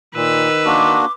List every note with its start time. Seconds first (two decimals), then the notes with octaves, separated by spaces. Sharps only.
0.15 A#2 D#3 B4 E6
0.65 A#3 D4 F#4 C6 D6